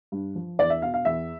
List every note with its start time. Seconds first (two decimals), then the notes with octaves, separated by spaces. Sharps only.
0.12 G2
0.35 F3
0.59 E2 D5
0.70 E5
0.82 B2 F5
0.94 F5
1.05 E2 E5